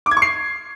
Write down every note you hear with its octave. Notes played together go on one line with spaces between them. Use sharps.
D6
G#6
C#6
C7